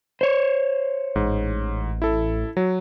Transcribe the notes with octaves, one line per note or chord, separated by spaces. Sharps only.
C5 C#5
A1 G#2
E4 A4
F#3